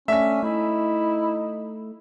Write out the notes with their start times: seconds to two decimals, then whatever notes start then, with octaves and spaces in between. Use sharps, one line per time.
0.08 A3 C#4 D4 E5 B6
0.43 A3 D#4 E4